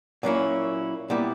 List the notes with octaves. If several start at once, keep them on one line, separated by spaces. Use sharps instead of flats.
A#2 F#3 A#3 C#4 E4
A#2 G3 B3 E4